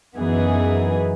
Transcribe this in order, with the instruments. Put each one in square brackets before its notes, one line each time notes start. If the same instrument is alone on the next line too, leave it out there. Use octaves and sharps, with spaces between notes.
[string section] F#2 E3 B3 D#4 G#4